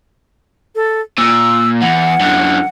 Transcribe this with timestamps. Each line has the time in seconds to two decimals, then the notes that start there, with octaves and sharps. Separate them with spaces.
0.75 A4
1.18 A#2 E6
1.81 E2 F#5
2.20 F#2 D3